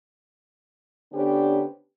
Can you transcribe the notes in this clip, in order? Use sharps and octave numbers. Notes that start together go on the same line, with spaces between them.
D3 B3 C#4 D4 G4 C5